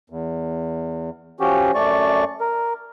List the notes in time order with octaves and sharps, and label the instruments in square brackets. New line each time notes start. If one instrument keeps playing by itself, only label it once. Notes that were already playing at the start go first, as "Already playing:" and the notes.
[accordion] E2
F3 C#4 F#4 G4
F#2 A3 D5 C#6
A#4